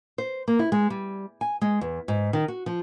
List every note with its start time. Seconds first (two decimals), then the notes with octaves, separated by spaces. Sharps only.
0.18 C5
0.48 A#3
0.59 E4
0.72 G#3
0.90 G3
1.41 G#5
1.61 G#3
1.81 E2
2.08 G#2
2.33 D#3
2.48 F#4
2.66 F3